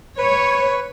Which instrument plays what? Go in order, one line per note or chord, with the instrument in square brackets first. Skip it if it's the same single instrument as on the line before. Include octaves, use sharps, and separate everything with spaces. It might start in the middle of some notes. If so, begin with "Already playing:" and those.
[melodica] B4 [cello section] C#5